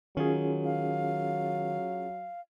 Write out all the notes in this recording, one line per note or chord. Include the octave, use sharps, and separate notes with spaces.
D#3 F#3 C#4 F4 G#4
F5